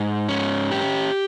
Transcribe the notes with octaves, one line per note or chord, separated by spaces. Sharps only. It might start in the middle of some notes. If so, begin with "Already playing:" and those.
Already playing: G#2
C#4
G4